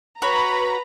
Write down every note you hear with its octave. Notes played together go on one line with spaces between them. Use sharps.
F#4 B4 C#5 A#5 B5